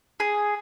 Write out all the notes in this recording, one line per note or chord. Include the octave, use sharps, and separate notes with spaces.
G#4